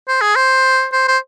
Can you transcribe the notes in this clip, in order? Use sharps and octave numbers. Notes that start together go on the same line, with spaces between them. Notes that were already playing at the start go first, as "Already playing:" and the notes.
C5
G#4
C5
C5
C5